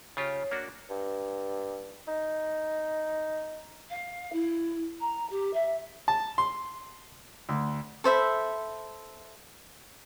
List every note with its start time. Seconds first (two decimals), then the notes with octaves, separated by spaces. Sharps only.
0.17 C#3 F4 G4 C#5
0.51 A#3 D4 F#4
0.90 G2
2.08 D#4
3.89 F5
4.32 E4
5.00 A#5
5.29 G4
5.53 E5
6.08 A5
6.38 C6
7.49 D2
8.04 A4 C5 E5 B5